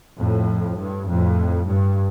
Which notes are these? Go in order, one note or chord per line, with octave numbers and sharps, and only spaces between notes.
F2 A2
G2
F2 A2
G2